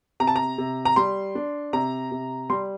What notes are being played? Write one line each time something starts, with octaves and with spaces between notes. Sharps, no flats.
C3 A#5
A5
A#5
C3
A#5
G3 C6
D4
C3 A#5
C3
G3 C6